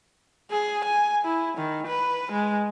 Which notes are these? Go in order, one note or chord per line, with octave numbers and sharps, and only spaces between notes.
G#4
G#5
E4
D#3
B4
G#3